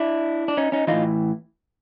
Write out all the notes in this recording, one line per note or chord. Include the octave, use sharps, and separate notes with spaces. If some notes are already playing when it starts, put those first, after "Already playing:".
Already playing: D4 E4
D4
C#4 D#4
C#4 D#4
A2 E3 D#4 F4